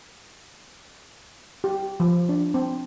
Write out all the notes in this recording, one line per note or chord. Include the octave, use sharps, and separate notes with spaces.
G4
F3
D4
C4